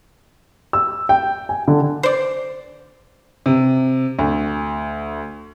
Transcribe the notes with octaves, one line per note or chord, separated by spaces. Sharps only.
E6
G5
G#5
D3
C5 D5
C3
D2